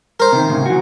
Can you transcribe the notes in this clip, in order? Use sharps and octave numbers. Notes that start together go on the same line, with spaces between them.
A#4 C5
C3 D#3
C2 A2 C#3
E3 F#4